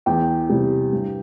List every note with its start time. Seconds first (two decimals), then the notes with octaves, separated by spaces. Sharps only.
0.06 E2 G5
0.49 C3 G3
0.93 G2